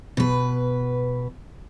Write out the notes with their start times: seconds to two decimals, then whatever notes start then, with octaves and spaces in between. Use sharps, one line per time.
0.17 B2 B4